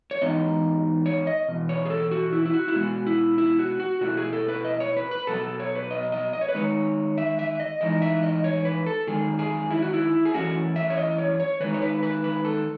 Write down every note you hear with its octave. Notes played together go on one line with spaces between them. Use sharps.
C#5
G#2 E3 B3 D#4 D#5
C#5
D#5
E2 B2
C#5
G#4
A4
F#4
E4
E4
F#4
E4
B2 G#3 B3 F#4
E4
E4
F#4
F#4
B2 A3 E4 F#4
G#4
A4
B4
D#5
C#5
B4
B4
B2 F#3 B3 A4
A4
C#5
B4
D#5
D#5
D#5
C#5
B4
D#3 G#3 D#4 C#5
E5
E5
D#5
A2 E3 G#3 D#4 D#5
E5
D#5
C#5
B4
A4
F#2 D#3 G#3 G#4
G#4
E4
F#4
E4
G#4
F#2 E3 A3 C#4 E4 F#4
E5
C#5
D#5
C#5
C#5
D#3 G#3 D#4 B4
C#5
B4
B4
B4
A4